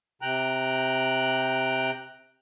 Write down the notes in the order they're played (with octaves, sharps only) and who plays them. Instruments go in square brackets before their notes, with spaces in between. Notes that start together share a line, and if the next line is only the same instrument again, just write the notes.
[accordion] C3 G5 A#5 F#6